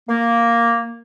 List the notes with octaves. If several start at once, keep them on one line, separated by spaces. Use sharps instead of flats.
A#3